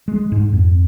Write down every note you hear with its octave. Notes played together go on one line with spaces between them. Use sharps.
G#3
G#2
F2